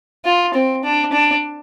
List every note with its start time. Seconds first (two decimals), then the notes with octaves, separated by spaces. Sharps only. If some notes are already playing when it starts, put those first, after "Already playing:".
0.25 F4
0.55 C4
0.84 D4
1.12 D4